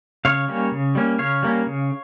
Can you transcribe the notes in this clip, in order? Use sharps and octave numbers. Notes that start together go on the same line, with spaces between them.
C#3 C#5 F5
G3 A#3 C#4
C#3
G3 A#3 C#4
C#3 C#5 F5
G3 A#3 C#4
C#3